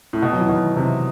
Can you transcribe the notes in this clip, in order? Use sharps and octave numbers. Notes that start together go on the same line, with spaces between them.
A2
B2
F#3
E3
B2 D#3
C3 E3